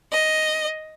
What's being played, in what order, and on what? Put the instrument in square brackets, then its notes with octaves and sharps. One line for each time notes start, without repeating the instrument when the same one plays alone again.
[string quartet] D#5